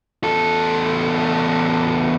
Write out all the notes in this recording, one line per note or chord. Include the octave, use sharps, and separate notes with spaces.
E2 A4